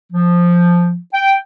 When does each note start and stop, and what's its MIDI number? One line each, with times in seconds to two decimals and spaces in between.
0.13 0.98 53
1.14 1.36 79